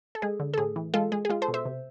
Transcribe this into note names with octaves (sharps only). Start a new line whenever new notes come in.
A4
G#3 G#4
D3
A4
A2 G#4
E3
G#3 F4 A4
G#3 G#4
G#4
G#3 F4
A4 C5
B2
C5 E5
C3